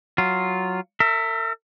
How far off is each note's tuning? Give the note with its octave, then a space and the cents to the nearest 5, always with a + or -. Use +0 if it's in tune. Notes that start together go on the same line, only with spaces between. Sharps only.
F#3 +0 F4 +0
A#4 -45 E5 +0